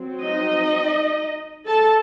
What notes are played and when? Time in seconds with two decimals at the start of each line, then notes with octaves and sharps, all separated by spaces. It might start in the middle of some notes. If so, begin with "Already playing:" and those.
Already playing: F#3 C4
0.22 D#4 D#5
1.66 A4 A5